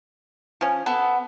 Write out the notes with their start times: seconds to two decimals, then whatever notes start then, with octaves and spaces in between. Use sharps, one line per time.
0.61 F3 C#4
0.86 B3 A4